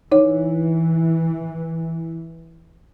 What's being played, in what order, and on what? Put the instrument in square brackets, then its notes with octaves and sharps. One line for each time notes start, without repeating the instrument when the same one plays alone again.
[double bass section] E3 [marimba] D#4 C#5